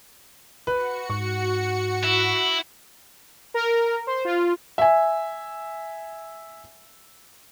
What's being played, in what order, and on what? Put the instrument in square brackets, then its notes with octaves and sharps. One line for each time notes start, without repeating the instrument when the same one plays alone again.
[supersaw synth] F#4 C#7 [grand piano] B4
[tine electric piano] G#2 [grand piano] C#6
[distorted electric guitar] E4
[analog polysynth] A#4
C5
F4
[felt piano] E5 G#5